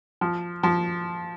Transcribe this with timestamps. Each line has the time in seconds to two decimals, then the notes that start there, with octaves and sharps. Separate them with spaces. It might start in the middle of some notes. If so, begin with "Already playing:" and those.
0.21 F3
0.63 F3